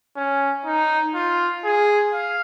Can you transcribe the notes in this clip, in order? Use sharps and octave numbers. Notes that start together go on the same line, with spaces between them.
C#4
D#4
F4
G#4
F5